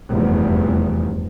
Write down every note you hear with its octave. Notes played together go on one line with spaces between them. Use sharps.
F1 E2 G2